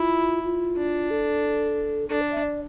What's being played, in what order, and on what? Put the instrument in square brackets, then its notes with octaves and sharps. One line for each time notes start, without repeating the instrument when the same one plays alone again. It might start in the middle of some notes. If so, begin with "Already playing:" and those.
Already playing: [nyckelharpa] E4 [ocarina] F4
[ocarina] F4
[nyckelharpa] D4
[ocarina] A4
[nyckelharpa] D4 [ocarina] A4
[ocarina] D5
E5
D5